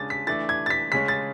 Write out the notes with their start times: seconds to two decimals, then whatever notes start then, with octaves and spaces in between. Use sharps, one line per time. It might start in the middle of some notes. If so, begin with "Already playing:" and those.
Already playing: C#3 G#3 D4 A6
0.10 B6
0.27 E3 A3 D4 A6
0.49 G#6
0.66 A6
0.70 B6
0.92 C#3 G#3 C#4 B6
1.08 A6